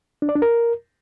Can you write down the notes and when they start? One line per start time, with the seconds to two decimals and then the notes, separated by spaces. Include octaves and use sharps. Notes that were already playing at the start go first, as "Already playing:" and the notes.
0.22 D4
0.29 D5
0.35 D4
0.42 A#4